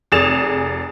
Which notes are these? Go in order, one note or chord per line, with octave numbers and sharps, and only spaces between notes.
F1 G#4 D#6 A6 E7 F7